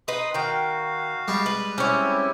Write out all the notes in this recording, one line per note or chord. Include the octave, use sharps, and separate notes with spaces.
D#4 B4 C6 D#6
D#3 F#4 F5 G5
G3 G#3
B4
C4 C#4 E4 G4 C#5